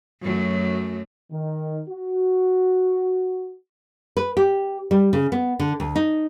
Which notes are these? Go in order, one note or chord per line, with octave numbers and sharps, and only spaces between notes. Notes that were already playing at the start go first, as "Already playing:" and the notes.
F#2 F#3 A3
D#3
F#4
B4
G4
G3
C#3
B3
D3
D2
D#4